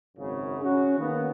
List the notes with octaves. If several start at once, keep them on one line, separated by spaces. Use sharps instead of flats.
G#1 F#2 C#3
C#4 F#4
D#3 A#3 B3